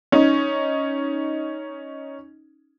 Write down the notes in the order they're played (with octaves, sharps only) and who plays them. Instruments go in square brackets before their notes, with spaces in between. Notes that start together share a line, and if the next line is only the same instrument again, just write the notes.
[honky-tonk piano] C#4 D#4